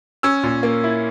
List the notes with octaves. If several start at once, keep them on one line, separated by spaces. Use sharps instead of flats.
C#4 E6
A#2
A#3
E4